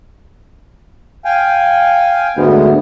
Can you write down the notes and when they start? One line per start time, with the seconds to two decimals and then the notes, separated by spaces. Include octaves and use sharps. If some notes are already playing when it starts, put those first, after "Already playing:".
1.25 F5 G5 G#5
2.37 D2 G#2 G#3 B3